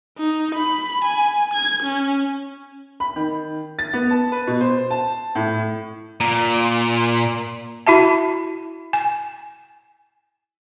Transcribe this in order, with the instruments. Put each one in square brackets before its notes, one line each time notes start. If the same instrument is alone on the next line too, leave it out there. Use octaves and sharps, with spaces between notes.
[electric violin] D#4
B5
G#5
G#6
C#4
[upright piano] B5
D#3
A6
B3
A5
B4
B2
C5
A5
A2
[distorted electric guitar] A#2
[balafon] E4 F#4 E5 A5
G#5